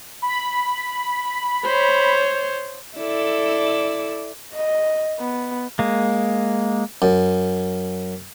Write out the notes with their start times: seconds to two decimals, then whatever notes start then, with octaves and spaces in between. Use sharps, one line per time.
0.22 B5
1.64 C5 C#5
2.97 E4 A4 D5
4.54 D#5
5.19 B3
5.79 G#3 A#3
7.02 F#2